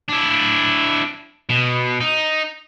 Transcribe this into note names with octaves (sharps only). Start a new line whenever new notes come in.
D4 E4
B2
D#4